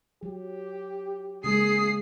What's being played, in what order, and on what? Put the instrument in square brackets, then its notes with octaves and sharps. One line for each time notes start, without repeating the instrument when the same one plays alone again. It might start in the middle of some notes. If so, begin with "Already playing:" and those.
[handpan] F#3 [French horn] G4
[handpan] C#3 G#3 A#3 [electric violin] G#4 C7 [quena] D#6